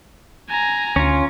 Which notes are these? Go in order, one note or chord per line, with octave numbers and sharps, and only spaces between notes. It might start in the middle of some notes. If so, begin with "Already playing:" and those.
G#5 A#5
D2 C#4 F4